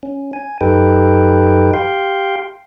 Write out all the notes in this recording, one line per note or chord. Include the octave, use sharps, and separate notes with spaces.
C#4
G#5
F#2 D#4 G4 A4 B4 G5
G4 F5 G5 C6